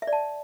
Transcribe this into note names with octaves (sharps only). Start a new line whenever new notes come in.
E5
D5
A5